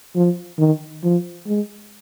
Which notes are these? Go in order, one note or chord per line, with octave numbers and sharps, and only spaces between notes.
F3
D#3
F3
G#3